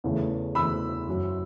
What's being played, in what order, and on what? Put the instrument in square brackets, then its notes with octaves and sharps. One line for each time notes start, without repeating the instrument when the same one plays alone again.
[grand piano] E2 C#3 E3 A3
[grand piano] E2 C#3 E3 A3 [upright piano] B5 E6
[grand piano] F#2 F#3 C#4 E4